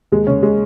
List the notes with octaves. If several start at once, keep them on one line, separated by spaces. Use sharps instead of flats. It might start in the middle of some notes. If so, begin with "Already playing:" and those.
D#2 G#3
C#3 C#4
G#3